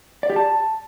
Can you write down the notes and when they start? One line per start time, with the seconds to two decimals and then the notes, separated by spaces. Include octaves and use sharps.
0.23 D5
0.30 G4
0.36 A5